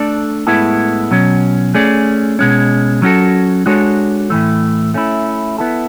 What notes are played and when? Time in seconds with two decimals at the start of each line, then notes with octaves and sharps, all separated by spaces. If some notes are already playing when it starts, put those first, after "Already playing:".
Already playing: A3 D4 A4 D5
0.47 A2 G#3 B3 E4 A4
1.11 B2 F#3 C#4
1.74 A3 C#4 G#4 D5
2.39 B2 G#3 C#4
3.02 F#3 C#4 F#4 A4
3.66 G#3 D4 F#4 A4 C#5
4.30 A2 E3 A3
4.94 A3 C#4 E4
5.58 B3 E4 A4